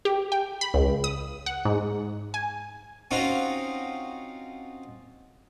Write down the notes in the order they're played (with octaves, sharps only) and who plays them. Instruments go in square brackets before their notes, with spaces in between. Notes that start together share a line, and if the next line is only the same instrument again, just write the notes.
[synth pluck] G4
G5
B5
C#2
D#6
F#5
G#2
G#5
[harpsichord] C4 C#4 D#4 F4 F#4